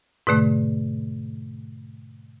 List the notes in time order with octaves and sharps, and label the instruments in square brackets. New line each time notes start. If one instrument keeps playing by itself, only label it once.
[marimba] G#2 B2 D3 A3